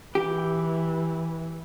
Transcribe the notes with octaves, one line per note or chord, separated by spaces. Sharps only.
E3 G4